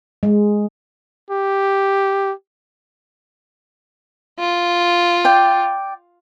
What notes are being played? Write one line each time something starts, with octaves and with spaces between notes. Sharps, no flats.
G#3
G4
F4
D5 G5